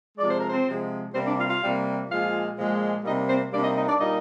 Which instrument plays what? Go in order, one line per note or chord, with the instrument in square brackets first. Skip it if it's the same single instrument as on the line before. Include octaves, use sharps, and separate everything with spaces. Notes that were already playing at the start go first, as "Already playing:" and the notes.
[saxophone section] C3 F3 G#3 D5
C5
A#4
C4 C5
C3 F3 G#3
C3 G3 A#3 C4 C5
D4 D5
F4 F5
F4 F5
C3 G3 A#3
A#2 F3 G#3 F4 F5
A#2 F3 G#3
C3 G3 A#3 D#4 D#5
C4 C5
C3 G3 A#3 D4 D5
D#4 D#5
D#4 D#5
D4 D5
A#2 G3 A#3 D#4 D#5